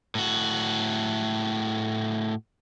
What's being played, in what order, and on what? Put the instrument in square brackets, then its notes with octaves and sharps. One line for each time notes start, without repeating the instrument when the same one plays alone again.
[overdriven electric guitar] A2 F#4